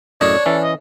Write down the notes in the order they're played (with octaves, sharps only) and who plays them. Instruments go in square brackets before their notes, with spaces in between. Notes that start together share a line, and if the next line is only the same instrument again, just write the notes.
[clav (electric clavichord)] F#2 A2 D#5 [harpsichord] D4 [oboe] C#5
[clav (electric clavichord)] E3 C#4 [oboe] A4
[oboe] D#5